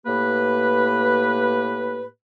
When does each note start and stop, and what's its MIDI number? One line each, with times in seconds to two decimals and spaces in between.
0.07 2.06 45
0.07 2.06 58
0.07 2.06 67
0.07 2.06 71